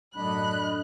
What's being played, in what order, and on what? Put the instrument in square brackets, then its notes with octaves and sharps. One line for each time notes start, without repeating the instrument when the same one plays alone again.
[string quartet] F#2 A2 D3 [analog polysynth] D4 D#5 [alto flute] B5 [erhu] F#6